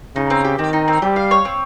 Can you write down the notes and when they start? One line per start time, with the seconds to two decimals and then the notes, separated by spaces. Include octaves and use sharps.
0.16 C#3 D#4
0.30 C4
0.44 G4
0.59 D#3 C4
0.73 D#4
0.88 C4
1.02 G3 G4
1.16 F5
1.31 C#5
1.45 C4